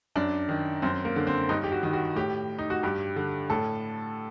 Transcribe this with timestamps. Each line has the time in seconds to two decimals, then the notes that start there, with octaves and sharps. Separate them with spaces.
0.16 F#2 D4
0.49 D#3
0.82 F#2 C4
1.05 A#3
1.16 D3
1.27 C4
1.49 G2 D#4
1.64 G4
1.72 F#4
1.83 D#3
1.93 F#4
2.16 A2 G4
2.58 D#4
2.70 F#4
2.83 G2 G4
3.16 D3
3.50 A2 A4